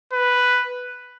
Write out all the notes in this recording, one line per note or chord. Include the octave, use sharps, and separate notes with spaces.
B4